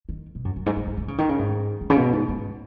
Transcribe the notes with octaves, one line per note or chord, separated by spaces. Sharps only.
D#3
B2
F#2
F#2
G#2
G#2
G#2
D#3
C#3
D#3
C#3
G#2
G#2
C#3
B2
G#2
G#2